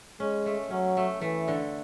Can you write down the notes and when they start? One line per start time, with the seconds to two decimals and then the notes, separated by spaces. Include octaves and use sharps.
0.20 G#3 C#4
0.46 A3
0.70 F#3 C#4
0.97 A3
1.21 E3 A3
1.48 D3